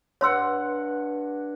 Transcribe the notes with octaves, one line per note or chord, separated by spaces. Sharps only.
G2 C#5 F#5 C6 E6